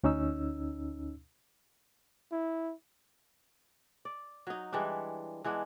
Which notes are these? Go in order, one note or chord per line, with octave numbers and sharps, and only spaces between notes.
D2 C#4 D#4 E6
E4
D5
F#3 D#4
E3 G3 G#3 D4
E3 G#3 B3 D4